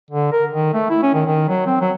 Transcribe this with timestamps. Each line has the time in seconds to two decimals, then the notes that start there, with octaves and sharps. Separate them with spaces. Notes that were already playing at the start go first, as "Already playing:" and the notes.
0.11 D3
0.32 A#4
0.53 D#3
0.74 A3
0.90 E4
1.03 C#4
1.14 D#3
1.27 D#3
1.48 F#3
1.67 C4
1.81 F#3